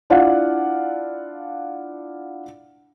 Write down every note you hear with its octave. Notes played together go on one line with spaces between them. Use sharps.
D4 E4 F4 D5 F5 F#5